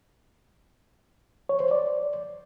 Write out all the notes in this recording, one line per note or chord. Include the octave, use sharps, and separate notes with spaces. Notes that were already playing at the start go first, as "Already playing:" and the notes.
C#5
C5
D5